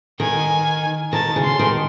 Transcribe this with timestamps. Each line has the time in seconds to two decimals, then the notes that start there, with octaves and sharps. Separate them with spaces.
0.20 D#3 G#5
1.13 D#3 A5
1.36 C#3
1.44 C6
1.59 D#3